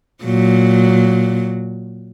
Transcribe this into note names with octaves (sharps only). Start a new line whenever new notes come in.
A#2 F#3